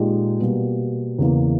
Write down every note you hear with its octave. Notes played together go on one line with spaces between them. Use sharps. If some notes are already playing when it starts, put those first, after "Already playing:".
Already playing: A#2 G#3 D#4 G4
B2 G3 A#3
E2 C#3 E3 A#3